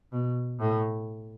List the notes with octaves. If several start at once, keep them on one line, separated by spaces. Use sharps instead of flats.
B2
A2